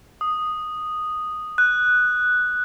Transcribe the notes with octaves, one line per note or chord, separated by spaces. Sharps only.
D#6
F#6